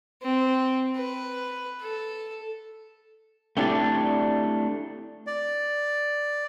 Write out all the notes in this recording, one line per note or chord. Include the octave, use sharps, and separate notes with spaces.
C4
B4
A4
A3 C4 D4 E4 G4 D5
D5